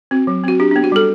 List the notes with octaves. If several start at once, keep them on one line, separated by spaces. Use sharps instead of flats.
C4 F#4
F#3
C4 F#4
D4 G4
B3 D4
F#4
G3 A4